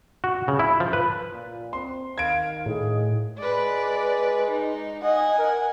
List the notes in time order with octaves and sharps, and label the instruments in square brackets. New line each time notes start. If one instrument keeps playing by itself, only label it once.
[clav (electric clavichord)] F#4
C#3
E4
F3
B4
[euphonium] A#2
[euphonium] C4 [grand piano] C6
[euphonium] D#3 [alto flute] F5 [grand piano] G#6 D7
[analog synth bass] A2 [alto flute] G#4
[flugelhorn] G#3 [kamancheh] B4 D5
[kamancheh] D#4
[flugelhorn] D#5 [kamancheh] F#5 G#5
[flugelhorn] A#4